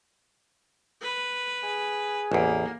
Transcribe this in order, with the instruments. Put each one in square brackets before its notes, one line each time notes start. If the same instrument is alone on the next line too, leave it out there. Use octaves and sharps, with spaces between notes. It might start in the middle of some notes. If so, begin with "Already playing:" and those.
[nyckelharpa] B4
[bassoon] G#4
[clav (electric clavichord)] A1 E2 [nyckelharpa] A#3